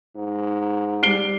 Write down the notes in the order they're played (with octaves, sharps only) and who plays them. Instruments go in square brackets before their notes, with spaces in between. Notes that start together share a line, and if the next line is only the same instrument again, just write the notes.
[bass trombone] G#2
[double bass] G3 [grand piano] C7 D7 G7